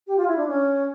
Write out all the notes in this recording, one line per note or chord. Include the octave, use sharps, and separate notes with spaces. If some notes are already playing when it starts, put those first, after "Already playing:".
G4
F4
E4
D4
C#4